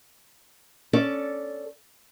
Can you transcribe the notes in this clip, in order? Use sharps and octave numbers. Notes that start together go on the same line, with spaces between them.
C#4 A4 D5